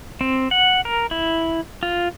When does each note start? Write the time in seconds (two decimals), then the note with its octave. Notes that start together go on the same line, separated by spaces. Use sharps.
0.21 C4
0.51 F#5
0.85 A#4
1.11 E4
1.83 F4